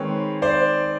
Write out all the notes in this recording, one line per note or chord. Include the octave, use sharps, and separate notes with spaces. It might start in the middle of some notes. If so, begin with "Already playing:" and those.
Already playing: D#3 G#3 C4 B4 C#5
C5 D5